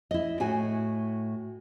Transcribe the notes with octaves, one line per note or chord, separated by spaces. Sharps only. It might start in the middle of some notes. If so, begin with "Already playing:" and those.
E4 D#5
A2 F#4 G#5